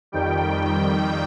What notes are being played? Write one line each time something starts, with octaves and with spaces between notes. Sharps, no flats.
F2 D#3 G3 G5